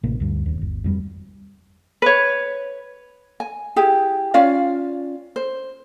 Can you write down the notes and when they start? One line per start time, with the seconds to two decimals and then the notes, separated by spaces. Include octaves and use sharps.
0.03 A1 C3 A#3
0.20 D2 G2
0.46 D#1 D#2
0.61 G1
0.84 F2 C#3 G3
2.02 B4 C#5
3.40 G#5
3.76 E4 G4 G#4
4.34 C#4 F4 D5 F5
5.36 C5